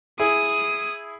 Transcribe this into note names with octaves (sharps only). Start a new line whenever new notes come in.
E4 G#4 D#6